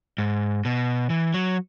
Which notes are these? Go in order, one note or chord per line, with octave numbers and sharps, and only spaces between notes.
G#2
B2
E3
F#3